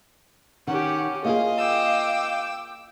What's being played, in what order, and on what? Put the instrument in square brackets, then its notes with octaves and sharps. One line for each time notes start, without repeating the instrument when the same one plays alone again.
[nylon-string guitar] D#3 [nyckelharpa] C#4 G4 [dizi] F#5
[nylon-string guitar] A#3 F4 G#4 [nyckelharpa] D#5 [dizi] F5
[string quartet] G5 D6 E6